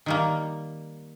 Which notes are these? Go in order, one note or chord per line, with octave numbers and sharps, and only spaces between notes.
D#3 G3 A#3